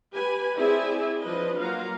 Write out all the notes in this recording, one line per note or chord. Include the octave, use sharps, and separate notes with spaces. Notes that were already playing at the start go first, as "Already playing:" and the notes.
G4 B4 G#5 B5
C4 E4 G#4 D5 E5 G#5
F3 D4 B4 D#5
F#3 A#3 F4 F5 F#5 A#5